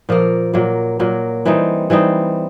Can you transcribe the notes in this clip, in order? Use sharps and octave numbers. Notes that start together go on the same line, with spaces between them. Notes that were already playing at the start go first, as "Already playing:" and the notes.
A#2 F3 A#3
A#2 F#3 A#3
A#2 F#3 A#3
E3 G3 C4 D#4
E3 G3 C4 D#4